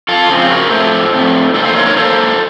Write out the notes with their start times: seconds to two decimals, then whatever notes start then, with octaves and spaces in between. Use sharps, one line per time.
0.08 F4 A4
0.29 C#3 F3 C4
0.50 F#4 A#4
0.70 A2 A3 C4 A4 C5
1.13 A2 A3 C4
1.54 D#3 A#3 A4 C5
1.65 A4 C5
1.76 A#4 C#5
1.86 A#4 C#5
1.96 D#3 A#3 A4 C5